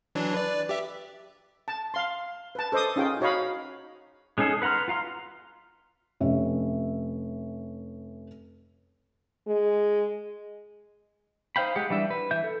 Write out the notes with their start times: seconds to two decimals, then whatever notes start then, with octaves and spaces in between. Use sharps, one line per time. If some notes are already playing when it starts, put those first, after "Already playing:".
0.15 E3 F#3 D4
0.34 B4 D5
0.69 G4 E5
1.68 A5
1.94 F5 C6
2.55 B4 A5
2.72 A4 C5 D#5 D6 D#6
2.96 C#4 D#4 F4 G#4 G5
3.20 D#4 F#4 C#5 D#5 F5 B5
4.38 G#3 C#4 D#4 G#4 A4
4.62 B4 F#5 A#5 C6 F6
4.88 F4 F5 A#5 C6
6.20 F1 C#4 E5
9.48 G#3
11.56 D#4 C5 F5 G5 B5
11.76 G#3 G4 F#5
11.90 E3 G3 D4 E5
12.10 B4
12.31 E3 E5 G6
12.44 A4